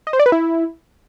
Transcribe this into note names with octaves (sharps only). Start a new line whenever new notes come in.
D#5
C5
D5
B4
E4